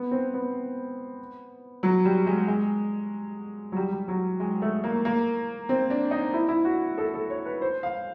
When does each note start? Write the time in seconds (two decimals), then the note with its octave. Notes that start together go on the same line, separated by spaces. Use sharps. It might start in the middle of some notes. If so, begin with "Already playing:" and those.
Already playing: B3
0.11 C4
0.34 B3
1.83 F#3
2.05 G3
2.27 G#3
2.48 G#3
3.72 F#3
3.76 G3
3.92 G3
4.08 F#3
4.40 G#3
4.62 A3
4.84 A#3
5.05 A#3
5.69 C4
5.90 D4
6.11 D#4
6.34 E4
6.49 E4
6.65 F#4
6.98 A4
7.14 A4
7.30 C#5
7.46 B4
7.61 C5
7.83 F5